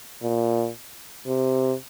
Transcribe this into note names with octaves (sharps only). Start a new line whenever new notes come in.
A#2
C3